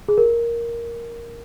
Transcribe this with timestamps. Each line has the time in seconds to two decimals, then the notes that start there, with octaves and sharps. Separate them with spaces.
0.08 G#4
0.18 A#4